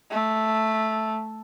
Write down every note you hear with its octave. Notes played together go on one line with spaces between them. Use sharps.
A3